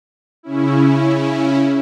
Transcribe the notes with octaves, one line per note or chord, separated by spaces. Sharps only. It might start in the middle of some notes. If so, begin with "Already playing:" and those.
C#3 C#4 E4